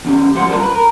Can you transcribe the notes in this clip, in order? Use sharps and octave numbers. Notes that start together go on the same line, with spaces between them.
E2 C#4 G4
G#2 F3 G4 C5 F#5 C6
F#2 G3 F4 A#4 A5
A#4 B4
A#4